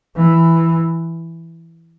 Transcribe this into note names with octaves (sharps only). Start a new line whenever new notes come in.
E3